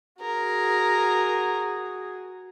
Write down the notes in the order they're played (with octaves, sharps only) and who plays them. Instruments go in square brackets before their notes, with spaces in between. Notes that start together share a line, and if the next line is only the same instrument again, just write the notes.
[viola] F#4 G#4 [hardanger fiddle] A#4